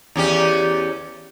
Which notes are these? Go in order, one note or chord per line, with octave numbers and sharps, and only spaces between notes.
E2 C#4 G4